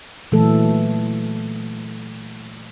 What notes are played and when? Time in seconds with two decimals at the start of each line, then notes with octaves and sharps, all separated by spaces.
0.32 A#2 E3 F#3 A3 A4